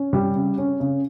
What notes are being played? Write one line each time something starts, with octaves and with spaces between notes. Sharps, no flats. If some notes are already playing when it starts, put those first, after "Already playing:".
Already playing: C#4
G3
C#3
C#4
C#3